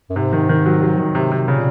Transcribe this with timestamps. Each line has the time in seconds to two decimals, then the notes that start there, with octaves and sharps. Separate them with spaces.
0.10 F#2
0.16 G#2 C3
0.33 D#3
0.49 D#3
0.66 F#3
0.82 F#3
0.98 D#3
1.15 C3
1.32 C3
1.48 A#2 C#3